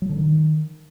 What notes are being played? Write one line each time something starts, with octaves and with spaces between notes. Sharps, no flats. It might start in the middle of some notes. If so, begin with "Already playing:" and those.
F#3
D3
D#3